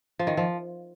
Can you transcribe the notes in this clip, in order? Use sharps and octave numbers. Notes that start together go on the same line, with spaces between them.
F3
D#3
F3